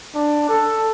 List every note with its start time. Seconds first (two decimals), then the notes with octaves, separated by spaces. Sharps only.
0.15 D4
0.49 A4